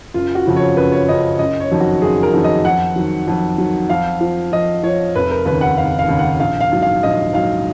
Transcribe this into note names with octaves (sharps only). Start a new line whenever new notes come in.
F#1 F4
F#4
F2 C#3 F3
C#5
F#1 B4
C#5
F2 C#3 F3 D#5
F#1 D#5
C#5
F2 D#3 F#3
F#4
F#1 G#4
A#4
F2 D#3 F#3
D#5
F2 F#5
D#3 F#3
F2
D#3 F#3
F2 F5
F3
F2 D#5
F3 C#5
F1 B4
A#4
D#2 C#3 B4
F#5
F1 F5
F5
D#2 C#3
F#5
A#1 F5
F5
G#2 F#3
F5
A#1 D#5
G#2 F#3 F5